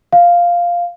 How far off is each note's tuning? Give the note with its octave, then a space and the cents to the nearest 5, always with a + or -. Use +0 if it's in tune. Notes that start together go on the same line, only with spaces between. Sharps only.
F5 +0